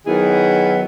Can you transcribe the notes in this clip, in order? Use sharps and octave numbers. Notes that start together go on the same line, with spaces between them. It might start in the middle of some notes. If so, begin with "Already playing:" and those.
D#3 F#3 B3 E4 G#4